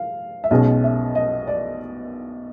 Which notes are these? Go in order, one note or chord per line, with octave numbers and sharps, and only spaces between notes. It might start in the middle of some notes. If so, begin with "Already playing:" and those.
Already playing: F5
E5
B1 B2 G#3 C#4 D#5
E5
D#5
D5